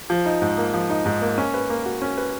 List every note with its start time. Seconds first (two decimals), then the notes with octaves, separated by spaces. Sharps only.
0.10 F3
0.26 D#4
0.42 G#2
0.58 A#3
0.73 F3
0.90 D#4
1.06 G#2
1.22 A#3
1.38 C#4
1.54 B4
1.70 A#3
1.86 F#4
2.02 C#4
2.17 B4